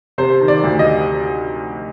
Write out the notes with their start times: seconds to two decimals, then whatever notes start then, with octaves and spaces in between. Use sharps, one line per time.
0.18 C3 C5
0.41 D#3
0.48 D5
0.64 D2
0.79 D#5